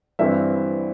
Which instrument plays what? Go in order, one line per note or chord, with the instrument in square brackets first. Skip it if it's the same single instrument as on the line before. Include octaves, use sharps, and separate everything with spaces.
[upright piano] G2 E3 G3 C4 E5